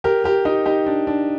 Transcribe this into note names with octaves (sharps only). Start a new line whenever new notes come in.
G4 A#4
G4 A#4
D#4 G4
D#4 G4
D4
D4